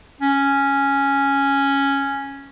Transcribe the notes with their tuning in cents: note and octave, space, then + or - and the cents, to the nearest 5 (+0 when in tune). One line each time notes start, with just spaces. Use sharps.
C#4 +0